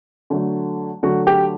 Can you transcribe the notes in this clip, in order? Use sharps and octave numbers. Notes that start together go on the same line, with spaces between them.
D3 F#3 A3
D3 F#3 A3 F#4
G4